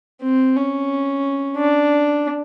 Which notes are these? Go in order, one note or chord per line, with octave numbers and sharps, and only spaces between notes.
C4
C#4
D4